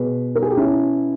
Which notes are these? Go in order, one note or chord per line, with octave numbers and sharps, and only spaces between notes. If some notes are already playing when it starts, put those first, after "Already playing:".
Already playing: B2 G#4 B4
A#4
G#4
G4
C#4 E4